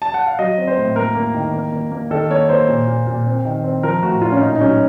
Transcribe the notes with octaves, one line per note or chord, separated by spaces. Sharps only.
A5
F#5
F5
F#3 D#5
C4
C5
A2
A#3 A#4
A#3
D#3
A#3
A#3
A#3
D#3 A4
A#3 C#5
A#3 C5
A#2
A#2
A#2
C4
D#3
C4
F3 A#4
A2 F#4
A2 F4
C#4
A#2 D#4
D#4
F#3 C#4